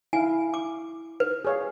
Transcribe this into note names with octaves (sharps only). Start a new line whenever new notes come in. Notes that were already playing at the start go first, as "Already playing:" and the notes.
E4 F5 G#5
D6
B4
G#4 C#5 F5